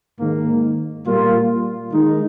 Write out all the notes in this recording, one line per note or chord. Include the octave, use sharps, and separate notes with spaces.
G#2 D#3 A#3
A#2 G3 A#3 F4
D#3 G#3 D#4